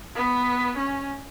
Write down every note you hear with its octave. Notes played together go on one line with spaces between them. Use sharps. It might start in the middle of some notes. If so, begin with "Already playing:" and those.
B3
C#4